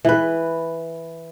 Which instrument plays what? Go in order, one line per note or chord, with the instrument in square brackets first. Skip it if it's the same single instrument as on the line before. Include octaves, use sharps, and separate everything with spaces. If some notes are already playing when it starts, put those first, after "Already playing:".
[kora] E3 B4